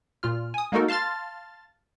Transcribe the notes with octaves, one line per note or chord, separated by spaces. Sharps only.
A#2 F4 F6
G#5 D#6
G#3 A#3 D#4 F#4 A4 A#4
F5 A5 C6 F6 A6